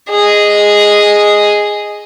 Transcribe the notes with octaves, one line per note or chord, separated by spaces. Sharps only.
G#4 D#5